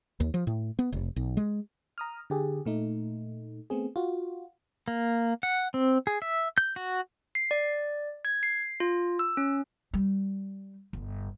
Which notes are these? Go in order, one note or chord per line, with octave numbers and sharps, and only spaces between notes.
D#2
F3
A2
B3
F1
B1
G#3
A#5 D#6 F6
D3 G4 G#4
A#2 A3 D#4
A3 B3 C4 G#4
F4 F#4
A#3
F#5
C4
G#4
E5
G6
F#4
C7
D5
G#6
C7
F4
E6
C#4
G3
G1